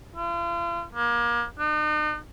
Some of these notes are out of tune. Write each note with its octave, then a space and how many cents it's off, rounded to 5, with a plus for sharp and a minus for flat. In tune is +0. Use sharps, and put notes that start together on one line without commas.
F4 -40
A#3 +30
D#4 -45